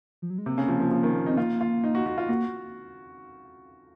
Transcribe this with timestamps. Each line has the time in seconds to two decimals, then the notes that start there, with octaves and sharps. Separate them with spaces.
0.22 F3
0.30 F#3
0.38 G#3
0.46 C3 A#3
0.58 C#3
0.68 F3
0.80 F3
0.91 F3
1.03 D#3
1.26 C4 D#4
1.37 A#3 F4
1.61 F4
1.84 D#4
1.95 F#4
2.06 F#4
2.18 F4
2.29 A#3 F#4